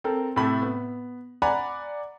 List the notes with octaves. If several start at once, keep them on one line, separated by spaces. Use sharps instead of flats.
C4 A4 A#4
A2 C3 A3 A4 B5
B3
D5 F#5 G#5 A#5 B5